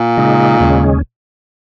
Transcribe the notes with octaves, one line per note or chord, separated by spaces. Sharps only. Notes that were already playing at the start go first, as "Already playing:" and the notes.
Already playing: A#2
C#3 G#3 D#4
D#2 C#3 G#3 C#4